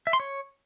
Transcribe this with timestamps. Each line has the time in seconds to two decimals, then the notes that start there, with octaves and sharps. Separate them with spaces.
0.07 E5
0.13 C6
0.20 C#5